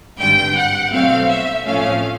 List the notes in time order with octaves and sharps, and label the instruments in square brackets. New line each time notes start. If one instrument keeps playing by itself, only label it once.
[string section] G#1 G2 D3 G5
F#5
B1 B2 F#3 A3 C4 F5
E5
A2 F3 A3 C#4 F5